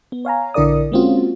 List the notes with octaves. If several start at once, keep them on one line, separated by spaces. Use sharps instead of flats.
B3
C#5 F5 G#5 A#5
A#1 D3 E4 A#4 D5 D#6
G#3 A#3 C4 C#4 F4 F#4